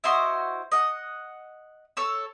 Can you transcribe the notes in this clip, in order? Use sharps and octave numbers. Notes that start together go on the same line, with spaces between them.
E4 F#4 C5 D#5
D#5 F#5
A4 C#5 E6